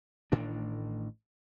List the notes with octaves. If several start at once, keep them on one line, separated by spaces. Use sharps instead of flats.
A1 A2 D#3 D4